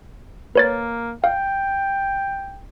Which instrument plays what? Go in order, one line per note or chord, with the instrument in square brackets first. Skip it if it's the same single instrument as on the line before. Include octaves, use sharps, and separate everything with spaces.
[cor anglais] A#3 [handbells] B4 C#5 A6
[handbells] F5 [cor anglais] G5